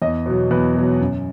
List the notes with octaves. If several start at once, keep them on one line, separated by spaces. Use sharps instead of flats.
E2 D#5
B2 F#3
E2 B4
B2 F#3
F#2